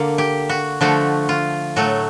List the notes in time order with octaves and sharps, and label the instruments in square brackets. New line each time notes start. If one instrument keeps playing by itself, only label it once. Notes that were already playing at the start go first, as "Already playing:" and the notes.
Already playing: [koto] D3 A#3
G4
F#4
D3 F3 A3 F#4
F4
A2 F#3 A3 F#4